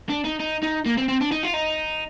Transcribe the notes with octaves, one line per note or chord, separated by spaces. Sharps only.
D4
D#4
D#4
D#4
A#3
C4
C4
D4
D#4
F4
D#4